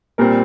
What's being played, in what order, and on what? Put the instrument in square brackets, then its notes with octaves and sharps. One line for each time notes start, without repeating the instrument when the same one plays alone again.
[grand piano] A#2 G3 C4 A#4